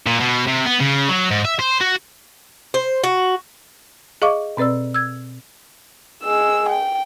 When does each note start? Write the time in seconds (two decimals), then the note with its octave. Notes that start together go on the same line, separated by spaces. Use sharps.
0.07 A#2
0.20 B2
0.48 C3
0.66 B3
0.81 C#3
1.09 F#3
1.31 G#2
1.45 E5
1.59 C5
1.81 F#4
2.74 C5
3.04 F#4
4.22 G#4 D#5 F5 C#6 D6
4.57 B2 C4 B4 D5 E6
4.94 E6 G#6
6.23 G#3 E6
6.69 G5